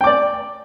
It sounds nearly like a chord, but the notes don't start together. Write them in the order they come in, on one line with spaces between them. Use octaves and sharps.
G5 D6 D5